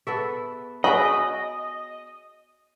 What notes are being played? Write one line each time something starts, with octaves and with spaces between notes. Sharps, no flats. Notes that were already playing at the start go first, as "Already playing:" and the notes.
B3 G#4 A4 E5
F#4 G#4 C#5 D#5 E5 G#5 B5 C#6